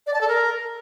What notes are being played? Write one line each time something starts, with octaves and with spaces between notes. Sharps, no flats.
D5
A5
A4
A#4